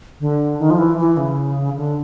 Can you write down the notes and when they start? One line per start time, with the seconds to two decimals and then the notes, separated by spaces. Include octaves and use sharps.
0.20 D3
0.59 D#3
0.70 F3
0.78 E3
0.98 E3
1.17 C#3
1.76 D3